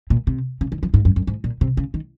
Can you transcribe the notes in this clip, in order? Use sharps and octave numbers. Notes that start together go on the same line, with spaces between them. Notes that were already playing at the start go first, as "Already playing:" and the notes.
A#2
C3
C#3
D#3
F3
G#2
F#2
F#2
G#2
A#2
C3
C#3
D#3